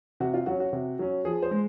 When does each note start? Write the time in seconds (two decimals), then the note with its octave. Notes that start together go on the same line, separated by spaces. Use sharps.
0.20 C3 F#4
0.34 F4
0.46 F#3 C#4 F#4
0.60 F#4
0.73 C3
0.99 F#3 C#4
1.25 F3 G#4
1.42 C5
1.51 G#3